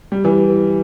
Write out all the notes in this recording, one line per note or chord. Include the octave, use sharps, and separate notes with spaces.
G3
E3